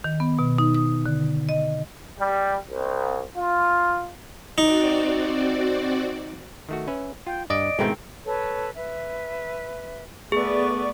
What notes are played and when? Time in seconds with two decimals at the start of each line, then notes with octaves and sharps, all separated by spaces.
0.04 D#3
0.20 B3
0.39 B2
0.58 D#4
0.75 D#6
1.06 D3
1.49 D#5
2.19 G3
2.70 C2
3.36 F4
4.58 C4 D#4 F#4 D5
6.69 D#3 A3 F#4
6.88 C#4 B4 E5
7.27 F4 G5
7.50 G2 D5 D#5 D7
7.79 G#2 B2 D#3 A3 C4 E4
8.25 A4 B4 C#5
8.76 B4 E5
10.32 A3 B3 G#4 D5 C#6